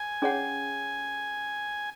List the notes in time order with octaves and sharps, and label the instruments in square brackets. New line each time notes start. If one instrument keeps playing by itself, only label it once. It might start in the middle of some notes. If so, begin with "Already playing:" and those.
Already playing: [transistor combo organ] G#5
[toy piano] C#4 G#4 C#5 F#5